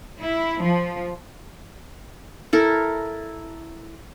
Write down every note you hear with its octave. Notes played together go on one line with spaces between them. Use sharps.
E4
F3
E4 A4 A#4